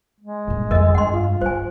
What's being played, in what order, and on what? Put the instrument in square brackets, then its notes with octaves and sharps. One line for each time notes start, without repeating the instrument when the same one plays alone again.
[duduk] G#3
[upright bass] G2 A#2
[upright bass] F2 D#3 [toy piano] A#4 D#5
[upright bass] G2 [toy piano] F#5 C6
[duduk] F4
[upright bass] F#3 B3 [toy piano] C5 G#5